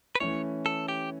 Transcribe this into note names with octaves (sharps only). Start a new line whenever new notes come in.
B4
E3 A3 C#4 E4 C#5
A4
G4